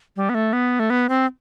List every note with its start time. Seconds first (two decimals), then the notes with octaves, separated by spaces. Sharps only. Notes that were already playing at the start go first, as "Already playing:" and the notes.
0.16 G3
0.29 B3
0.34 A3
0.53 B3
0.79 A3
0.90 B3
1.09 C4